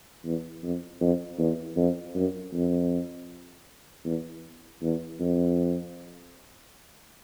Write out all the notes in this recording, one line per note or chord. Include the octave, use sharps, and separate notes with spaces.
E2
F2
F2
E2
F2
F#2
F2
E2
E2
F2